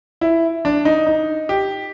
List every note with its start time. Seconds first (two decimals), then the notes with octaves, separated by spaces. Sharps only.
0.21 E4
0.65 D4
0.85 D#4
1.07 D#4
1.49 G4